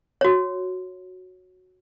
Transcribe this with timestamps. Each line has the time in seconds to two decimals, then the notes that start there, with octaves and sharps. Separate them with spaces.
0.21 F#4 C#5